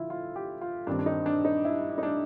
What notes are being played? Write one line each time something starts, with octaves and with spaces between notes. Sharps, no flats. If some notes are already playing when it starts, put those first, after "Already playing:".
Already playing: D3 F3 E4 F4
F4
G4
F4
G2 D#3 G3 C4 D4
D4
D#4
D4
D#4
E4
D#4
D4